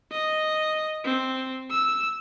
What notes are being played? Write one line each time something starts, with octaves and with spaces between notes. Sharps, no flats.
D#5
C4
E6